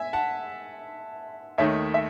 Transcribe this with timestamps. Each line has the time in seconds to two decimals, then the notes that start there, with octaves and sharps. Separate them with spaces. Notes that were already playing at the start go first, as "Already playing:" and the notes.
Already playing: E5 G#5
0.13 F#5 A5
1.58 D#2 D#3 A3 D#4 C#5 E5
1.94 E5